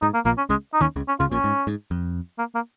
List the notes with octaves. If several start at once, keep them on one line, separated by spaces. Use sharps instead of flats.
G#2 D#4
A#3
A#1 A#2 A#3
C#4
C#2 C#3 G#3
D#4
D#2 D#3 C#4
C#2 C#3
C#4
C#2 C#3 F4
A#1 A#2 C#4
G#2
G#2
F2
A#3
A#3